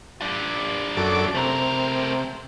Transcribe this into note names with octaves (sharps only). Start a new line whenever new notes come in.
D4 F4
F#2 A4 D6
C3 A3 A#4